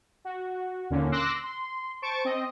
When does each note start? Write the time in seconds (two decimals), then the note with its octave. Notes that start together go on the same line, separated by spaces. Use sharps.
0.25 F#4
0.90 D#2 A#2 D3 A#3 C#4
1.12 C6 D6 E6 F#6 A#6
1.44 C6
2.02 C5 A5 C#6 D7
2.25 C4 D#5